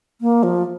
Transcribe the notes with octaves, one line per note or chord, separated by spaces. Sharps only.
A#3
F3